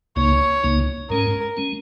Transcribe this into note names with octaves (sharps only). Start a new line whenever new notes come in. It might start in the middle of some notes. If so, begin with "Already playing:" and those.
C#2 C#3 A#3 D#4 C#5
C#2 C#3 A#3 D#4
G#2 G#3 C#4 A#4
G#3 C#4